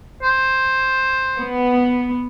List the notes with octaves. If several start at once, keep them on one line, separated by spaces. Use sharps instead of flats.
C5
B3